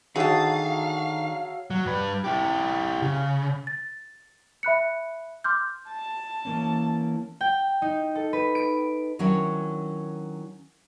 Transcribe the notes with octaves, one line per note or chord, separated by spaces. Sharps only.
D3 D#3 F#3 F#4 G#4 E5 F5 A5
F#3
G2 B4
E4 G4
C#3
A6
E5 B5 F#6 C#7
C6 D6 F6 G6
A5
E3 A#3 C#4
G5
D#4
A4
B4
D7
D#3 F#3 C#4 D4 E4 C#5